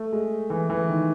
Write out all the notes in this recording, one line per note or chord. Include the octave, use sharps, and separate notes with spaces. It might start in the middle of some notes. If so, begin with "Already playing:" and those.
Already playing: A3
G#3
E3
E3
D#3